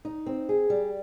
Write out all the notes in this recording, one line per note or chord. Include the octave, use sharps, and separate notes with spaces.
D#4
C4
G#4
G3